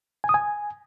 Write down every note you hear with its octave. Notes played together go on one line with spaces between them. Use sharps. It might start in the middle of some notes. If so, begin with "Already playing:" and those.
G#5
D#6
G#5